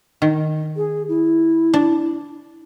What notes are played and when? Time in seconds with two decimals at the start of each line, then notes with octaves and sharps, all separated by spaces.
0.22 D#3
0.77 G#4
1.09 E4
1.74 D4